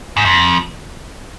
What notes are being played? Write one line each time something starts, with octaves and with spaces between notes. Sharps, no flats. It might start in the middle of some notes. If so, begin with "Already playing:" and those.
G#2
F2